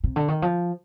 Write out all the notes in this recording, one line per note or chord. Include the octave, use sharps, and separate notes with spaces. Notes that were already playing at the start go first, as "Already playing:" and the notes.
C3
D3
D#3
F3